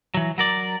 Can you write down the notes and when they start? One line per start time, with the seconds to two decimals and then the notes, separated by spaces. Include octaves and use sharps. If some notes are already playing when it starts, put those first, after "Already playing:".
0.14 E3 F#3
0.38 F#3 A#4 D5